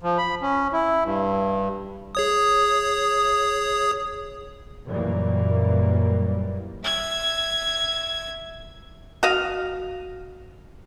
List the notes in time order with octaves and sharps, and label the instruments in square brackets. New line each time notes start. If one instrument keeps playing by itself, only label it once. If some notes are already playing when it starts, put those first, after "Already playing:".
[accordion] F3
B5
C#4
E4
G2
[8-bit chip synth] G#4 C#5 D#6
[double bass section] F#2 A#2 E3 G3 A#3
[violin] E5 G#6
[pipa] F#4 D#5 F5